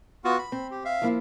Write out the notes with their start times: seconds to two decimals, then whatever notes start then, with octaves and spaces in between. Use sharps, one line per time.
0.24 B3 F4 F#4
0.38 B5
0.52 C4
0.71 G4
0.85 E5 F5
1.02 F3 A#3 E4